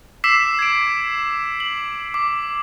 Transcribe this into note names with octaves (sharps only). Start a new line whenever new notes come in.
D6 E6 B6 C7 E7
G#6 D7
F#7
D6